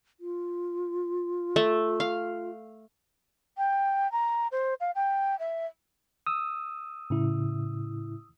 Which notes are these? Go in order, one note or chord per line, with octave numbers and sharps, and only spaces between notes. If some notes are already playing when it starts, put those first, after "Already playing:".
F4
A3
F5
G5
A#5
C5
F5
G5
E5
D#6 E6
A2 C#3 E4